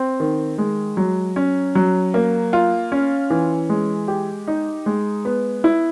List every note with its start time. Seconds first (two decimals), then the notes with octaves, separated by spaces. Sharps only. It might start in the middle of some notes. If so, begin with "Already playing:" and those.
Already playing: C4
0.20 D#3
0.58 G#3
0.97 F#3
1.36 C#4
1.75 F#3
2.14 A#3
2.53 F4
2.92 C#4
3.30 E3
3.69 G#3
4.08 G4
4.48 D#4
4.86 G#3
5.25 B3
5.64 E4